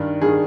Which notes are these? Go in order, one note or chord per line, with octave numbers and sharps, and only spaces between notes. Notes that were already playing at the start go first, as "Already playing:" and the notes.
Already playing: G2 D#3
G2 D#3 G#4